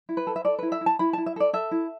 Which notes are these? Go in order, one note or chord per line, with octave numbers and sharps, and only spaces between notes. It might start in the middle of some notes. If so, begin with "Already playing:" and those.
E4
B4
A4
E5
A4 D5
E4 B4
E5
E4
A5
E4 B5
E4 A5
E5
A4 D5
A4 E5
E4